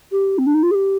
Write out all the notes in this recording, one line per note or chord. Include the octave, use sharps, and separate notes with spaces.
G4
C4
D4
D#4
F4
G#4
G4